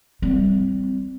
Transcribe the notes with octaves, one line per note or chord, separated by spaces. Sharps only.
G3 C4